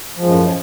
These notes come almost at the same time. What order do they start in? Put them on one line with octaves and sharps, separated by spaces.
F3 G#3 F#2 A2